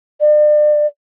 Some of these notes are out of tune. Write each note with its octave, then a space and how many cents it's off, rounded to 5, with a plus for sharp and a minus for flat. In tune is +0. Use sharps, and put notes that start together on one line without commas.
D5 +35